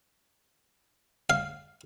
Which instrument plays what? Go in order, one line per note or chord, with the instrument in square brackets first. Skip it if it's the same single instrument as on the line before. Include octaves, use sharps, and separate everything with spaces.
[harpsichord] F5